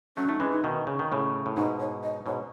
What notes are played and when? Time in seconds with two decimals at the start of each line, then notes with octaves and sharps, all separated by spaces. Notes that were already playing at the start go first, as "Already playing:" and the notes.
0.17 F#3 A3 C#4
0.28 A3 D#4
0.40 E3 G#3 C#4
0.52 D#4
0.64 B2 D#3
0.87 C#3
0.99 D#3
1.12 A2 C#3
1.46 A2
1.56 G#2 B2 D#4
1.80 C#5
2.03 D#5
2.26 G#2 B2 C#5